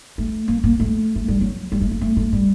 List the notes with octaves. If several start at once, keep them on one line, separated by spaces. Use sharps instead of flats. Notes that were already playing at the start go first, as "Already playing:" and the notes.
A3
A#3
A#3
A3
A3
G3
F#3
G3
A3
A#3
A3
A3
G3